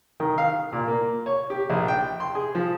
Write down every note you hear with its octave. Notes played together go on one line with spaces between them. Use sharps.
D#3
F5
A#2
A#3
C#5
G4
A#1
G5
C6
G#4
F3